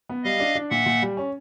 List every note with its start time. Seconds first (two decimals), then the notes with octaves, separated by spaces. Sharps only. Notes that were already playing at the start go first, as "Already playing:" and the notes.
0.09 B3
0.24 G3 D#5 F5
0.40 D4
0.55 D4
0.71 A#2 E5 F#5
0.86 A#2
1.02 G3
1.17 C#4